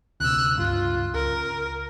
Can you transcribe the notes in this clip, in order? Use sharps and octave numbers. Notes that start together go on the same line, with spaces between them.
D2 C3 E6 F#6
C#2 G2 F4
C#2 A#4